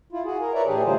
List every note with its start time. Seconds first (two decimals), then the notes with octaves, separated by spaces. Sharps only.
0.12 E4 F4
0.25 F#4 G#4
0.40 A#4
0.54 A#4 B4 C#5 D5 E5 A#5
0.67 A2 E3 D4 G4 G#4
0.85 D3 G3 A3 F4 G#4 C5